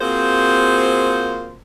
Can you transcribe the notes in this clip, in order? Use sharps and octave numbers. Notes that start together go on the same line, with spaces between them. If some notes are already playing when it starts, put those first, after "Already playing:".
A#3 C4 F4 F#4 G#4 C5